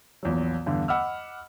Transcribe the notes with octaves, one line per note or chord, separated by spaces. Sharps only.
A#1 E2 F#3
E2 G2 D3
D#5 F#5 B5 D6 E6 F6